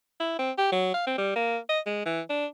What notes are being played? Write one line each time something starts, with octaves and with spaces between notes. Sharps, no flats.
E4
C4
G4
F#3
F5
C4
G3
A#3
D#5
G#3
E3
D4